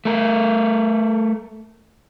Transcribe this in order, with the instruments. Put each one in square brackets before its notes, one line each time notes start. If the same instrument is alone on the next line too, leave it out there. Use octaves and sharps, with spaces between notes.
[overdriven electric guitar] A3 A#4